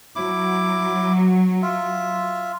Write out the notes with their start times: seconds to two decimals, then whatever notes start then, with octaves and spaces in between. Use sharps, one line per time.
0.16 F#3 E4 D6
1.62 F4 E5